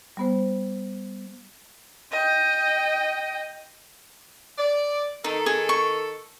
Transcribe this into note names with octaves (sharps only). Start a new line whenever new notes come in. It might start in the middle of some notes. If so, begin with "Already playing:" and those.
G3 B3 C5
D#5 G5
D5
D#3 D#4 A4
G#4
C#6